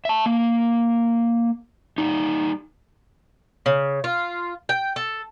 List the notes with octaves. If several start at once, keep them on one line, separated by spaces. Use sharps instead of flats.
E5 A5
A#3
G3 D#4
C#3
F4
G5
A4